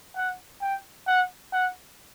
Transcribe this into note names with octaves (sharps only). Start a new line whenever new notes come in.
F#5
G5
F#5
F#5